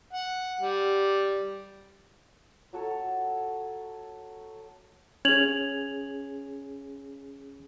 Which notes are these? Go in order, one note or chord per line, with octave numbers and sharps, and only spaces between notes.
F#5
G3
F#3 F#4 A4 C#5
C#4 G#4 G#6 F7 F#7